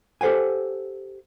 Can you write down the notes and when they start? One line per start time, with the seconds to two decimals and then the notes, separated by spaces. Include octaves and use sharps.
0.21 G4 A4 C5 F#5 G#5